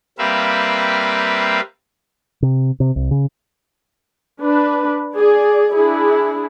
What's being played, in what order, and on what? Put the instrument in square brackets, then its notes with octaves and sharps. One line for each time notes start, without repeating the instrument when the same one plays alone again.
[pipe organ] G3 A#3 C4 B4 E5 F5
[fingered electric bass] C3
C3
C2
C#3
[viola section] D4 B4
G#4 D5
D4 E4 G#4